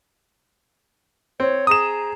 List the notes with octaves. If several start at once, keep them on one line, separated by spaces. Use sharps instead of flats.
C4 C#5
G#4 A#5 D#6 E7